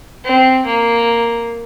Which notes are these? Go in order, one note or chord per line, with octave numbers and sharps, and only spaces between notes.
C4
A#3